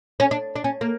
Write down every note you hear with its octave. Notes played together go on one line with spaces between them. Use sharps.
C#4
D4
D4
C#4
A#3